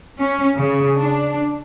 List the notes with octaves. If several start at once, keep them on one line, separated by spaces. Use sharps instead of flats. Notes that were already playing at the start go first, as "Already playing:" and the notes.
C#4
C#3
D4